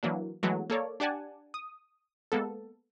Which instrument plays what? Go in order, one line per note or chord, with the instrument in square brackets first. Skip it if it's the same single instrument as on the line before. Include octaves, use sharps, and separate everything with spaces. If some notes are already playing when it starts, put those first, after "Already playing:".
[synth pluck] E3 F#3 A#3 D4
E3 F#3 G#3 A3 B3 F#4
A#3 A4 C#5 D5
D4 G4 D5 F#5 G#5 A5
D#6
G#3 A#3 B3 A4